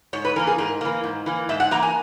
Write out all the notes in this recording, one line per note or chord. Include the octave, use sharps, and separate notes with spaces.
G#2 C#5
B4
E3 A#3 A#4
G#4
G#2 A#4
E3 A#3
G#2
E3 A#3
G#2 E5
F#5
E3 A#3 A#5
G#5